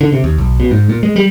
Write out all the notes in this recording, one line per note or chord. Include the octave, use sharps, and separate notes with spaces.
D3
C3
D#2
B1
B2
G#2
A#2
G#3
G3